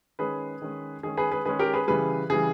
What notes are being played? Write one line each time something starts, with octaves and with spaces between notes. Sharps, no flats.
D#3 G#3 C#4 G#4 B4
D#3 G#3 C#4
D#3 G#3 C#4 G#4
G#4 B4
G#4 B4
D#3 G#3 C#4 G#4 B4
G4 A#4
G#4 B4
C#3 E3 G3 G#4 B4
C#3 E3 G3 G#4